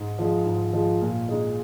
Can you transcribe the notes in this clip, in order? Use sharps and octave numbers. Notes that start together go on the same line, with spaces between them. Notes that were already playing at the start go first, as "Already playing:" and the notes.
Already playing: G#2
F3 G#3
G#2
F3 G#3
A#2
G#3 D#4